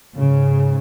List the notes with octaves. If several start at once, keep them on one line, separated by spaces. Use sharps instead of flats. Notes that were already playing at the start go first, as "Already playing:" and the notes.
G#2 C#3